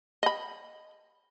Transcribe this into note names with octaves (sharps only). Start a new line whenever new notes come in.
D#5 B5